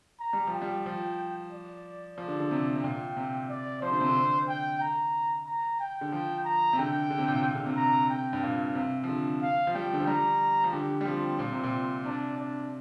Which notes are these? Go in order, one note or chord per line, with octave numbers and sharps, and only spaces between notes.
A#5
G3
F3
G5
G3
F3
D5
F3 D5
D3
D3
C3
C3
A#2 G5
C3
D5
F3 C5
D3
C3
D3
G5
A#5
A#5
G5
D3
F3
A#5
C3
D3 G5
D3
C3
A#2
C3
A#2
D3
C3
A#5
G5
G2
A#2 F5
C3
F3
D3
F5
F3
G3 G5
D3
F3
G3 A#5
F3
D3 G4
G3
F3 C4
A#2 C4
C3
A#2
C3 D4
D4